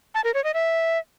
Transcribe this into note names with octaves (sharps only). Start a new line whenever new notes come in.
A5
A#4
C#5
D#5
E5